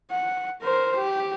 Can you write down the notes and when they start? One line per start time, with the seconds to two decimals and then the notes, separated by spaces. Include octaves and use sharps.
0.11 F#5
0.63 A#4 C5
0.96 G4